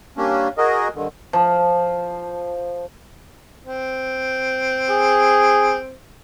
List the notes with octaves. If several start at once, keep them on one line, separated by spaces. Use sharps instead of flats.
G3 A#3 C#4 D4
F#4 G#4 A#4 D#5
G2 D3 D#3
F3
C4
G#4